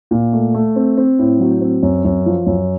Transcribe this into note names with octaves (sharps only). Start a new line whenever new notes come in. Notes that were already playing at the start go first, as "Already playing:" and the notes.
A#2
A3
A3
C4
C4
A2
F#3
C4
F#2
F#2
F3
F#2